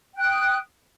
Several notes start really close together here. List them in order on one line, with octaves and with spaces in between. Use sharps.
G5 F#6 D#6